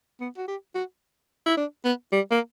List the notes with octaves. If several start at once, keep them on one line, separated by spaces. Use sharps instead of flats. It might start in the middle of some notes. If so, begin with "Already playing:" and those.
B3
F#4
G4
F#4
E4
D4
B3
G3
A#3